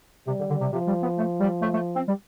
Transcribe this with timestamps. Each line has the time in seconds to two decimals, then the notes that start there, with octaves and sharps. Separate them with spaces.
0.27 C3 G3
0.39 D3
0.50 D3
0.61 C3
0.73 C3 F3
0.87 G3
1.02 B3
1.18 A3
1.41 G3
1.62 A3
1.74 A3
1.96 C4
2.08 G3